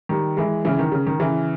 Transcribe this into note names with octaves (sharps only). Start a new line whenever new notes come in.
D#3 G3
E3 G#3
C#3 E3
D#3
C#3
D#3
C#3 E3